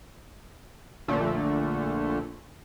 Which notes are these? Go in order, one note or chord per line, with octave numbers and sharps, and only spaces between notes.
A#1 A#2 D3 A3